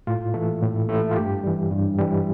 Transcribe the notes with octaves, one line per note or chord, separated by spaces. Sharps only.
A2 F4
E3 A3
A2
E3 A3
F4
G2 G4
E3 G3
G2
E3 G3